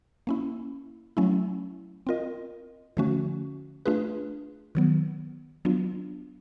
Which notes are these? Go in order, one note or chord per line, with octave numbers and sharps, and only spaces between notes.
A#3 C#4 E4
F#3 A3 C#4 E4
C4 F4 A#4 D#5
D3 F3 A3 C#4 F#4
A3 D4 F4 G#4 B4
D#3 F#3 B3
F#3 B3 D4 F4